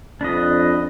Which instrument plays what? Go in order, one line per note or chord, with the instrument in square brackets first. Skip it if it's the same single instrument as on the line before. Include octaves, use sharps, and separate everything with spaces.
[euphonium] F2 [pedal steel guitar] D4 B4 D#5